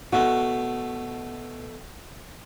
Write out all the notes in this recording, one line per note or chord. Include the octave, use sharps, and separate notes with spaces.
B2 A3 F#4